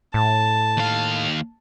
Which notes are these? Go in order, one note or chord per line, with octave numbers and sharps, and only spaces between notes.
A2 A5
D#2 F5